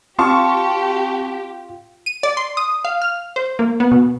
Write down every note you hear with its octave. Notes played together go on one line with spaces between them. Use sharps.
C4 F4 G4 F5 A5 C6 C#6
D#7
D5
C6
D#6
F5
F6
C5
A#3
B3
B2